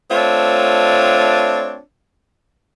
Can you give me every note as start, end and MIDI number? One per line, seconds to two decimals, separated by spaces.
0.11 1.80 57
0.11 1.80 60
0.11 1.80 62
0.11 1.80 65
0.11 1.80 73